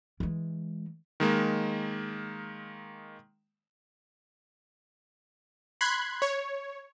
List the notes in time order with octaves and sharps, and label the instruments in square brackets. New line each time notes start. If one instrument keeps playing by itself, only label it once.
[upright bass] E3 G#3
[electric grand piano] D#3 G#3 A#3
[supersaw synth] B5 C6 F#6 G#6
C#5